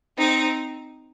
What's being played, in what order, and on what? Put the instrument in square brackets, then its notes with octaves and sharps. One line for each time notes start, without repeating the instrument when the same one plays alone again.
[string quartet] C4 D#4